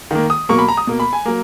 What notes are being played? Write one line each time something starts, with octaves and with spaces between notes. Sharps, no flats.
D#3 A#3
D#6
B2 F#3 A#3 C#6
B5
A#5
D#6
B2 A#3
B5
G#5
F#3 A#3